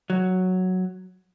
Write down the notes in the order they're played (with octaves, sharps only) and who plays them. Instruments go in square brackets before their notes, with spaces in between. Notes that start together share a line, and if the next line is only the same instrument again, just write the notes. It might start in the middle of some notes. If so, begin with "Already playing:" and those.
[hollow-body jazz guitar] F#3